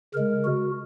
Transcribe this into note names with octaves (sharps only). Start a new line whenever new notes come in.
C#3 G#3 A#4
F#4